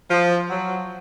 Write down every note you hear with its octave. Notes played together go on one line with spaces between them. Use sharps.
F3
F#3